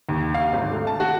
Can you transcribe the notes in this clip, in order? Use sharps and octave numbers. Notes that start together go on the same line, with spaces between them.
D#2
F5
G#1
A3
A5
F#4